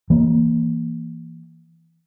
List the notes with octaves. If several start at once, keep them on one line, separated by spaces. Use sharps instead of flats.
E3 A#3